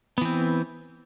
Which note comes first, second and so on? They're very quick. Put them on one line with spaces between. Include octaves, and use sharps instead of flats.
B3 E3 C4